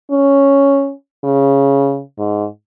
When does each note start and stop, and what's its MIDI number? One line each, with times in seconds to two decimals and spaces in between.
0.11 0.92 61
1.24 2.02 49
2.19 2.46 44